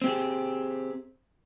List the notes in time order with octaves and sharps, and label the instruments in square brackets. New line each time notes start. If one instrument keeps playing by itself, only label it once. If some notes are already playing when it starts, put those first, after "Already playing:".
[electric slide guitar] C4 G4 G#4